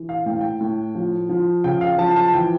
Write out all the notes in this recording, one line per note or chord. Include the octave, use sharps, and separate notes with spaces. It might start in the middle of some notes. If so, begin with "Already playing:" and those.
Already playing: E3
F5
A2 G5
F5
G5
A2
F3
F3
C#3 G5
F5
F3 A5
A5
E3 G5